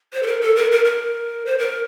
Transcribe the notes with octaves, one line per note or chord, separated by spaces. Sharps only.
C5
A4
A#4
A4
A#4
A#4
A#4
C5
A#4